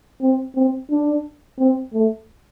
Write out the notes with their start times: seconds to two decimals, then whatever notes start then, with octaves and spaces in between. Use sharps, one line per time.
0.21 C4
0.55 C4
0.90 D4
1.59 C4
1.93 A3